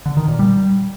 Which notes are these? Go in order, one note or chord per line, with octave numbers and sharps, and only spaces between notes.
D3
D#3
A#2
G3